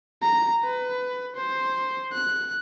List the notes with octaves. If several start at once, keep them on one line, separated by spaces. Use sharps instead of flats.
A#5
B4
C5
F#6